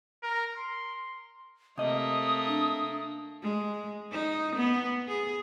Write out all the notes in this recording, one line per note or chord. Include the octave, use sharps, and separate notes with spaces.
A#4
C6
C3 A3 A#3 D#5 D#6
D4
G#3
D#4
B3
G#4